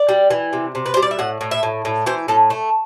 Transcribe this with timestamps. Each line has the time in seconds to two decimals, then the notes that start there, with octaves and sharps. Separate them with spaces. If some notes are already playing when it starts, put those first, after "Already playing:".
Already playing: D5
0.09 G3
0.30 E3
0.53 C3
0.75 C3
0.86 B4
0.94 G3 C5
1.02 D5
1.11 E5
1.19 A2 F#5
1.41 A2
1.51 E5
1.63 A2
1.85 A2
2.06 E3 C5
2.28 A2 A4
2.50 A3